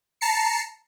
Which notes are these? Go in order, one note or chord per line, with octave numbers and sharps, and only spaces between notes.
A5 A#5 C7 C#7